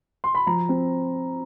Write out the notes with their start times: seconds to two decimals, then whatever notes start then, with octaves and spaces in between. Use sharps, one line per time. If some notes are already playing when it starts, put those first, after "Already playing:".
0.24 C6
0.35 B5
0.47 F3 A#5
0.69 C4